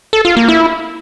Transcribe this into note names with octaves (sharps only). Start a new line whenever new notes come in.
A4
F4
A#3
E4